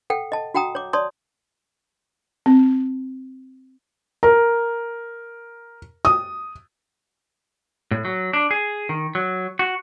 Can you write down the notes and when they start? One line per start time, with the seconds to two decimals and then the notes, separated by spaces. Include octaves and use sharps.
0.10 A4 F#5 G5
0.32 D#5 A5
0.54 F#4 F#5 G5 A#5 D#6
0.75 C#5 D6
0.93 C#5 D5 A5 C6 D#6
2.46 C4
4.23 A#4
6.05 D#6
7.91 A2
8.05 F#3
8.33 D4
8.51 G#4
8.89 D#3
9.15 F#3
9.59 F#4